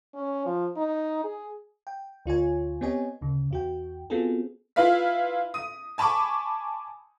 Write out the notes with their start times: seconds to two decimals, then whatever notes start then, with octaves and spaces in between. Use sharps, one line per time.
0.15 C#4
0.46 F3
0.77 D#4
1.24 G#4
1.87 G5
2.26 D2 F4 C#5 G#5
2.81 B3 C4 G4 C#5 D#5 G#5
3.21 D2 C#3
3.50 E2 F#4 G5
4.10 B3 C4 F4 F#4 G#4 A4
4.76 E4 F4 B4 F5 B6
5.54 D#6 D#7
5.98 G#5 A5 B5 C#6 D6